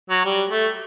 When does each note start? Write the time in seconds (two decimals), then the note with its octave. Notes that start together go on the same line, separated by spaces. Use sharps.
0.10 F#3
0.26 G3
0.50 A3